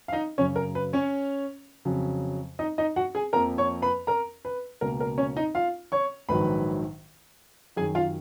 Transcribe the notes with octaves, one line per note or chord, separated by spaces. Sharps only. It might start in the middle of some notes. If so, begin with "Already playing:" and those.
F5
D#4 D#5
F#2 C#3 F#3 C#4 C#5
A#4
B4
C#4 C#5
F2 C#3 F#3
D#4 D#5
D#4 D#5
F#4 F#5
G#4 G#5
F2 F3 A#3 A#4 A#5
C#5 C#6
B4 B5
A#4 A#5
B4
C#2 B2 A#3 A#4
A#4
C#4 C#5
D#4 D#5
F4 F5
C#5 C#6
A#1 G#2 D#3 F#3 B4 B5
F#2 D#3 F#3 G#4 G#5
F4 F5